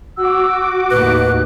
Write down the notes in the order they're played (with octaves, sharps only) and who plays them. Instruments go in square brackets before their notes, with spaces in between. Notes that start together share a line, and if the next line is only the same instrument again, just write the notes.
[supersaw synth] F#4 D6 [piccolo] E6
[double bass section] D#2 A2 [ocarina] B4 [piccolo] F#6